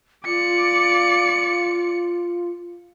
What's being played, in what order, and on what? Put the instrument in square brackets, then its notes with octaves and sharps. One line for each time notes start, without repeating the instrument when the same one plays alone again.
[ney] F4 [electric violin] D5 C#7